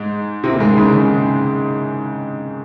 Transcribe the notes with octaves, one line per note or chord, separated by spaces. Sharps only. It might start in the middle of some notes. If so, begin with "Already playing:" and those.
Already playing: G#2 G#3
C3 C4
A#3
G#2 G#3
C#3
C#3